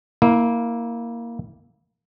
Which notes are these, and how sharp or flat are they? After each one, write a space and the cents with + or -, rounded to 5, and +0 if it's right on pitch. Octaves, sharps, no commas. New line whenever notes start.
A#3 +0 E4 -25